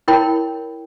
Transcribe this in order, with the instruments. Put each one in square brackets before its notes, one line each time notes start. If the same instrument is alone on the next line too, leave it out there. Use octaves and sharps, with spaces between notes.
[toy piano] E4 A#4 C#5 G5 B5